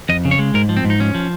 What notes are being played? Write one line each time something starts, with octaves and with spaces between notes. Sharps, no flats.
F2 D#5
C#3
C#5
G#3
G#2 A#4
F3
C4
G#2
D#4
F3 C#4
F3